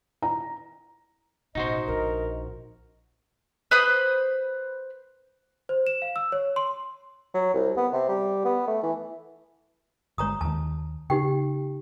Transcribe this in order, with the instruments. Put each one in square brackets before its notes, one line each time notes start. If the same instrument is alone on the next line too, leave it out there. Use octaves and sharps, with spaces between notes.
[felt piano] A#5
[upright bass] A1 B2 [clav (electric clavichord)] D#4 F#4 C5 [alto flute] D#5
[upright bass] A#1 [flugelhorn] A#4
[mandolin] B4 C5 B5 D#6
[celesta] C5
E7
F5
E6
C#5
C6
[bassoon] F#3
C2
B3
C3
G3
B3
A3
E3
[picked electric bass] G1 G#3 [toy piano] C#5 A#5 D#6
[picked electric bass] D#2 D#3 [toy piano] A5
[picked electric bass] C#3 [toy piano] D#4 G4 G5